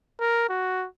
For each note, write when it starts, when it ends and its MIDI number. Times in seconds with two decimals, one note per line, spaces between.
0.20 0.49 70
0.49 0.86 66